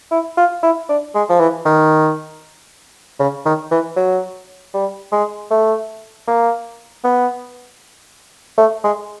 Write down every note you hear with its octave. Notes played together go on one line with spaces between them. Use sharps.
E4
F4
E4
D4
G#3
F3
E3
D#3
C#3
D#3
E3
F#3
G3
G#3
A3
A#3
B3
A3
G#3